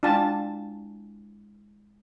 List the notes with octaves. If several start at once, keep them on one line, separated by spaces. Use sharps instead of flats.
G#3 D4 E4 F4 G5 A5